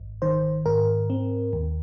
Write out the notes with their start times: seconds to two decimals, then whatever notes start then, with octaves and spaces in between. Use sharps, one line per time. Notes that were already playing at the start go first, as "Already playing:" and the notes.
Already playing: G#1
0.22 D#3 C5
0.66 G#2 A#4
1.10 C4
1.53 D#2